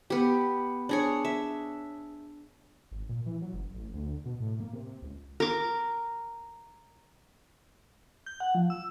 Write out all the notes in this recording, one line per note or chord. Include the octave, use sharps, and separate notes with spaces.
B3 G4
D4 G#4 C#5
E5
G#1
A#2
E3
F#3
F#1
A1
D2
B2
A2
A#3
C3
C#2
A#4 D6
G6
F#5
F3
E6